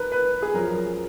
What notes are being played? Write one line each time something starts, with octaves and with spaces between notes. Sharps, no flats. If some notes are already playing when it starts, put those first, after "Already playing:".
Already playing: D#3 A#4 B4
B4
G#4
F#2 F3 A#4